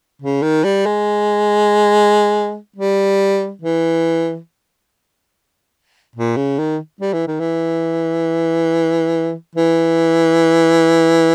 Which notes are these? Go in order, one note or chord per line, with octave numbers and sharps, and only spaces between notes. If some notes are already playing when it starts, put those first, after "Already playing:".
C#3
D#3
G3
G#3
G3
E3
A#2
C#3
D#3
G3
E3
D#3
E3
E3